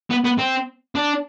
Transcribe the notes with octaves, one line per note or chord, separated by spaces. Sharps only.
B3
B3
C4
D4